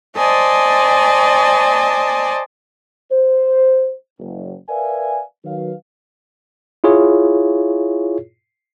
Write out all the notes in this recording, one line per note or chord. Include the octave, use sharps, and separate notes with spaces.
C5 D5 D#5 G#5 A5
C5
F#1
A#4 B4 D5 E5 F5 G#5
D#3 F#3 B4 F5
E4 F4 G#4 C#5